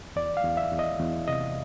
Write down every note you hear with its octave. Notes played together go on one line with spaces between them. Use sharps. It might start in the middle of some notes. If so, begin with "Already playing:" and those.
E2 D5
F5
E2
E5
E2
D#5
E2
C3 D#5